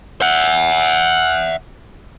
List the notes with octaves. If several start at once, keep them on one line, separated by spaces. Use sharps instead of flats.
E5 F#5